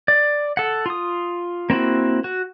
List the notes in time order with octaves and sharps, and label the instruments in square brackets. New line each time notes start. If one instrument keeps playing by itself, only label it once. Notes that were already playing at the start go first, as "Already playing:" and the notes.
[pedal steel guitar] D5
A4 F#5
F4 D#6
A#3 C4 E4 F#4
F#4